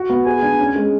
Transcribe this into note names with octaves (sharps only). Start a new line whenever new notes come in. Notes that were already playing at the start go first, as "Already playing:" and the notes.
Already playing: F#4
B3
G#4 G#5
D4
C#4
G#3